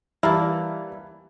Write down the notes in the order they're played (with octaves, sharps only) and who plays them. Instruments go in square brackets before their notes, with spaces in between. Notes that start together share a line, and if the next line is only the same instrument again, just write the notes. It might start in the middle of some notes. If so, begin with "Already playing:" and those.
[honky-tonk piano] E3 G3 [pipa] A#3 A5 [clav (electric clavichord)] E4